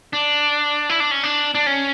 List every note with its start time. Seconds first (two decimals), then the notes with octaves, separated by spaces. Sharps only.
0.13 D4
0.89 E4
1.00 D4
1.11 C#4
1.23 D4
1.55 D4
1.67 C#4